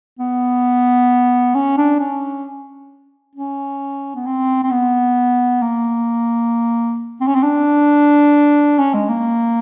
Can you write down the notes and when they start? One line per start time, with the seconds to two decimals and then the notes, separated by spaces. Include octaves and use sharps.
0.19 B3
1.55 C#4
1.78 D4
2.00 C#4
3.36 C#4
4.16 B3
4.26 C4
4.63 C4
4.71 B3
5.62 A#3
7.21 C4
7.27 C#4
7.35 C4
7.43 D4
8.79 C#4
8.94 G#3
9.09 A#3